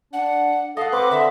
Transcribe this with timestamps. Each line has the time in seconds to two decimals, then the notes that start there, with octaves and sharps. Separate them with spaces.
0.13 D4 F#5
0.77 A4 D#5 F5 F#5
0.92 C4 B4 D6
1.11 D3 E5